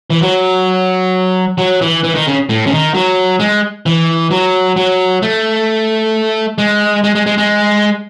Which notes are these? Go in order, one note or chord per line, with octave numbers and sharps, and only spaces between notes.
E3
F#3
F#3
E3
E3
D#3
C#3
A2
C#3
D#3
F#3
G#3
E3
F#3
F#3
A3
G#3
G#3
G#3
G#3
G#3